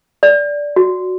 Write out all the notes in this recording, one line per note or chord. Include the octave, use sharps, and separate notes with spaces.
D5
F#4